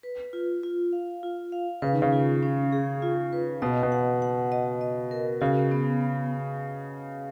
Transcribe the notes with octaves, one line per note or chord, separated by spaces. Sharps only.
B4
F4
F4
F5
F4
F5
C#3 B4
D#3
C#3
F4
C#4
G#4
F4
B4
B2 D#5
B2
F#5
F#5
D#5
D#5
A#4
C#3 F#4
B3
B3